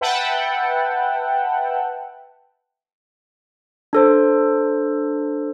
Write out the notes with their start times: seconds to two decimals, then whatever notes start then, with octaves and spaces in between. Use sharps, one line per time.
0.01 B4 E5 F#5 G5 A5
3.93 D4 A4 C5